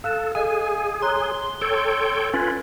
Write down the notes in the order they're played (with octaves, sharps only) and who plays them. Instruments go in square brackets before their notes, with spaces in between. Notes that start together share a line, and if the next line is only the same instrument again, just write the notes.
[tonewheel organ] A4 [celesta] F5 F#6 E7
[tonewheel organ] G#4 [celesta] A4 D#5 F5 [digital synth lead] G#5
[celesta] C#5 A#5 F#6 [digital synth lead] C6
[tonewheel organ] A4 C#5 G5 [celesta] E6
[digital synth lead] C#4 [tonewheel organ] F4 B4 [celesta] G#6 A6